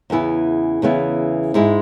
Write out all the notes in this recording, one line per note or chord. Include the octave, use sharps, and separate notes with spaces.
E2 C#3 E3 B3 E4
E2 C#3 E3 B3 E4
G#2 G#3 E4